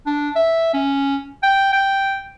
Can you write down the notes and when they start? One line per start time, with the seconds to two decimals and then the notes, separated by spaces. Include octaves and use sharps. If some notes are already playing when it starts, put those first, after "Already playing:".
0.06 D4
0.36 E5
0.74 C#4
1.43 G5
1.73 G5